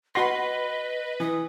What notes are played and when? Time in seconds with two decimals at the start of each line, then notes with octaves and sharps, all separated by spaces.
0.15 F#4 B4 D#5 F#5 B5 C6 A#6
1.20 E3 D#6